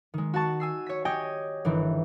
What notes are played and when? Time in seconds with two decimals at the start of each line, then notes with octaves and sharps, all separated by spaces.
0.14 D#3 G#3
0.34 F#4 F#5 A5 C#6
0.60 G#5 E6 C7
0.86 C#5 B6
1.05 G4 C#5 D#5 G5 G#5
1.65 G1 D#3 E3